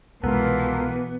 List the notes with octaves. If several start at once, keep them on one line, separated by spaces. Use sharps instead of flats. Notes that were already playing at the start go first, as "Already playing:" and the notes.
C2 B2 E3 G#3 B3 F4 A4 A#4